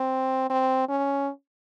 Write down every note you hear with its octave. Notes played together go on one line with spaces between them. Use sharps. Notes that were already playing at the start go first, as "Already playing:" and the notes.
Already playing: C4
C4
C#4